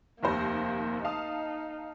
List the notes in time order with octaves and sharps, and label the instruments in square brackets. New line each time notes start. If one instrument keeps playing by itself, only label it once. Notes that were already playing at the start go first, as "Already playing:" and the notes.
[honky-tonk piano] F1 D#2 C5 [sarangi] A#3
[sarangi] D#4 [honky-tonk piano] F5 A5 D#6